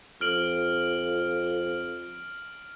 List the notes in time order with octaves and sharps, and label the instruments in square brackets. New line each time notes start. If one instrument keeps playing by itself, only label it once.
[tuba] F2 [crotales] F6 D7 F#7